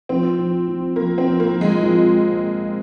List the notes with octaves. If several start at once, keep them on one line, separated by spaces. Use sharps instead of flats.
F3 C4
F3
F3
F3 A#3
C4
F3
A#3
F3
G#3
F3